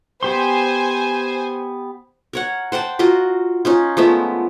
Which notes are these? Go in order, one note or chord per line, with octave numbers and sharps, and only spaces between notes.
B3 G4 C5 G#5 C6
A#4 C#5 F#5
C5 F#5 G5 A5
F4 F#4 A#4 D#5
C#4 D#4 F4
F3 G#3 A3 B3